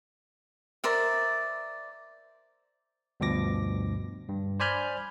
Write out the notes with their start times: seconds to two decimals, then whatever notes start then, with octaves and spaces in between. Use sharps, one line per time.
0.84 A#4 C5 D5 E5
3.20 D2 G2 B2 F3 D6 A#6
4.29 G2
4.60 C5 D5 G#5 B5 F6 G6